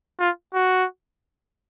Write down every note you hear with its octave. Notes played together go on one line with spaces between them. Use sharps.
F4
F#4